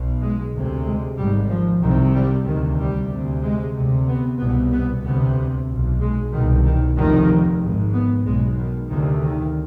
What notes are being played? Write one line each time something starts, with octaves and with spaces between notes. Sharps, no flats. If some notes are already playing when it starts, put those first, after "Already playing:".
Already playing: B1 B2
G#3
D2 C3
G#3
G#1 G#2 G3
F3
C2 C3 D#3
G3
D2 C3 D#3
G3
D2 C3
G#3
D2 C3
B3
C2 B2 B3
B3
D2 C3 B3
B1 B2
G#3
C2 B2 D#3
D#3
F1 D#2 D#3
G#1 G#2
B3
B1 B2 G#3
D#3
D2 C3 D#3
D#3